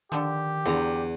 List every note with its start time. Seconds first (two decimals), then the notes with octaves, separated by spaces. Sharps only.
0.12 D3 D#3 F3 G4
0.66 E2 D3 A#5